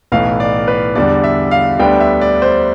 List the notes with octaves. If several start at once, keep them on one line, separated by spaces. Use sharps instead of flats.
B1 A2 E3 B3 F5
D5
B4
E2 D3 G3 D5
E5
F5
D2 D3 G3 B3 D4 G5
E5
D5
C5